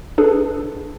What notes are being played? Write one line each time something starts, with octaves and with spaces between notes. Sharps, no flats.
D4 G#4 A4 B4